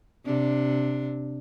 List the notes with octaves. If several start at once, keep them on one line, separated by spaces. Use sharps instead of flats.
C3 D4